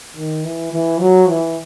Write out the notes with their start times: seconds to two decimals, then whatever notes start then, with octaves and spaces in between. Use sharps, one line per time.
0.17 D#3
0.44 E3
0.72 E3
1.00 F#3
1.29 E3